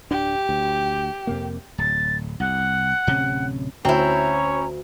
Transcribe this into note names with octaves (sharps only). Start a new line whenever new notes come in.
D1 D4 G4
D2
F2 C3 A#3
D1 A6
C2 F#5
D1 C3 C#4
D2 C4 C#4 E4 C#5 A#5